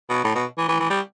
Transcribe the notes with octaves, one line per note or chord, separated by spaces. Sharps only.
B2
A2
B2
E3
E3
E3
G3